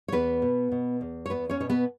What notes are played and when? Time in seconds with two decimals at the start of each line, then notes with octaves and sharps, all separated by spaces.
0.08 C#5
0.12 E2 B3 B4
0.42 B2
0.72 B2
1.01 E2
1.26 C#5
1.30 E2 B3 B4
1.50 C#4 C#5
1.60 B2 C#5
1.70 B3 B4